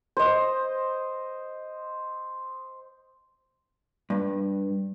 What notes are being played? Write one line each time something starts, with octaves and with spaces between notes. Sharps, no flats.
C5 D#5
G2